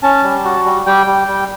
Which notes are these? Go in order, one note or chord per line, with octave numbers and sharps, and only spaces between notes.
C#4 A5
G3
F#4
G3
G3 G5
G3
G3